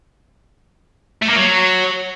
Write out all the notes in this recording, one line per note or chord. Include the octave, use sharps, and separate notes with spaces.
A3
A#3
F#3